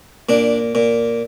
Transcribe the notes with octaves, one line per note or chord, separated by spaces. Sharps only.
A#2 D4
A#2